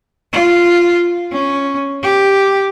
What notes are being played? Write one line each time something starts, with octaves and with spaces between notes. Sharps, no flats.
F4
C#4
G4